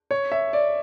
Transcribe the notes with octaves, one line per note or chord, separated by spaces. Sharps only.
C#5
E5
D5